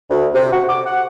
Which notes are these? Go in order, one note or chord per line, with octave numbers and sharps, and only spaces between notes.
D2
C3
F#4
D6
F#5